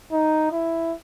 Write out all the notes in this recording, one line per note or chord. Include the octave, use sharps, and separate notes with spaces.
D#4
E4